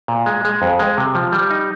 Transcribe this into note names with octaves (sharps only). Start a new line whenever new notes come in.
A#2
G#3
G#3
F2
G#3
C3
F3
G3
D#4